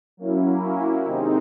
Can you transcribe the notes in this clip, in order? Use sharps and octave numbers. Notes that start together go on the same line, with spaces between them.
F#3 A#3 C#4 E4
C3 D#3 G#3 C4 D#4